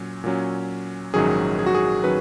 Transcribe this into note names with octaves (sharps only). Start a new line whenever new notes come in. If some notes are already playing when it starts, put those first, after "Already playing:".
Already playing: A#2 F#3 C#4
A#2 F#3 C#4
A#1 G#2 D#3 F#3 C#4 G#4
G#4
F#4
G#4
D#3 F#3 C#4 B4